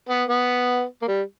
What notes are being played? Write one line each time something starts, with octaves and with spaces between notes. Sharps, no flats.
B3
B3
A#3
G3